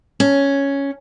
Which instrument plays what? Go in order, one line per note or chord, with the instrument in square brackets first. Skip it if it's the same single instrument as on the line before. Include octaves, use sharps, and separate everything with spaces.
[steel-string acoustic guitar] C#4